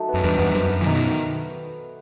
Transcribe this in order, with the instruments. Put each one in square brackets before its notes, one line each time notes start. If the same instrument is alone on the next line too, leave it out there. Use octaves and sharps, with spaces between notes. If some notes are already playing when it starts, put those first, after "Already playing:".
Already playing: [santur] F#3 A3 D#4
B3
[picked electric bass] F#2
[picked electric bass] E2 G2 [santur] B4
[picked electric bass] E2 G2 [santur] B3
[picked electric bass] F#2 [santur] C5
[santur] F#4
[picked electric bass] E3
[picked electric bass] B2 D#3 [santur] D#4